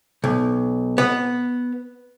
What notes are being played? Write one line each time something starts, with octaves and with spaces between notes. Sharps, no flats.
B1
B3